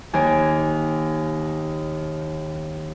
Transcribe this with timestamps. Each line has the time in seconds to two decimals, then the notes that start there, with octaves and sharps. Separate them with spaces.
0.13 D#2 G#5